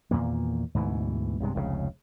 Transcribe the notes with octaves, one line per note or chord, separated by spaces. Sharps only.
E2 A#2 D#3 A#3
D2 G#2 B2 E3
B1 G2 C3 G#3
F1 C#2 G#2 C#3